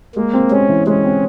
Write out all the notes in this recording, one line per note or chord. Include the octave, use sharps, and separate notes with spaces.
G#3 A#3
C4
G#3 C#4
E3
G#3 C#4
C4